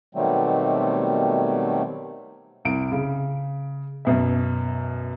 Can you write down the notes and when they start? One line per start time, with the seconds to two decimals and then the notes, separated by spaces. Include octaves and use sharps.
0.15 B2 D#3 F#3 G3 A3 C4
2.65 C2 D7
2.92 C#3
4.05 F#2 B2 E5